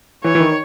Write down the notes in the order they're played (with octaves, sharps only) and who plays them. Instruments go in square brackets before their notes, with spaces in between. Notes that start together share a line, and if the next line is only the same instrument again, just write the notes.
[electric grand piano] E3 [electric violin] C#5
[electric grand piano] E3
D#3